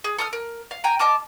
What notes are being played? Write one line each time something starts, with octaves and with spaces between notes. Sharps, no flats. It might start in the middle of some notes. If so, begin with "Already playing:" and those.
G#4
A4 D#6 F6
A#4
F5
G5 G#5 A#5
D#5 A5 D6 F6